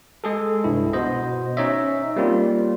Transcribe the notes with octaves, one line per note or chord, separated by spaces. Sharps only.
G#3 G#4 A4
C2 G2 E4
B2 B3 C5 D#5
C#4 D#4 C#5 D#5 E5
G3 A#3 C4 F4